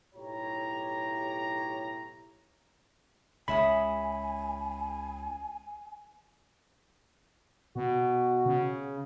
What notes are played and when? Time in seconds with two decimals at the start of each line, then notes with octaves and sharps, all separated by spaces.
0.14 B1 A2 E4 G4 C#5 A#5
3.48 C#2 C#3 C#5 E5 G#5 B5 D#6
7.76 B2 F#4
8.46 C#3